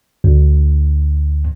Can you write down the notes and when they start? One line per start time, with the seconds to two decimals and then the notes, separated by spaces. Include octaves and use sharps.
0.24 D2